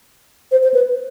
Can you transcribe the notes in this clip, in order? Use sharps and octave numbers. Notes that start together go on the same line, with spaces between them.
C5
C5
B4